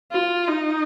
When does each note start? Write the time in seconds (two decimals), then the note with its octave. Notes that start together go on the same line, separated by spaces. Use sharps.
0.12 F4
0.48 D#4